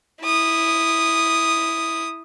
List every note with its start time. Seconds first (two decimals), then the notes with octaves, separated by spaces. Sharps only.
0.22 E4 D#6